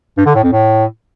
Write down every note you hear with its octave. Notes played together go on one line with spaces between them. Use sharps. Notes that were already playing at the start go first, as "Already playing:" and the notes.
G2
D3
A2
F2
A2